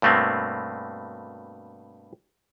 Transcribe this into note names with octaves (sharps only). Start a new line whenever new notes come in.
G2 B2 A3 A#3 C4